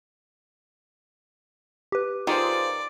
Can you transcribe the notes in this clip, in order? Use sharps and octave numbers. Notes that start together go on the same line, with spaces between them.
G4 B4
D#3 F4 G#4 C5 D5